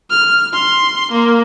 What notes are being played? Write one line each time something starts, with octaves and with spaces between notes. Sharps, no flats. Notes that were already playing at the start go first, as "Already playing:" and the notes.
F6
C6
A#3